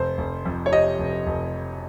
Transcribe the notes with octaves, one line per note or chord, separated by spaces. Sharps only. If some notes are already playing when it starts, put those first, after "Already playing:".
Already playing: F1 C5
F1
F2
C#5
C3 D#5
F1
F1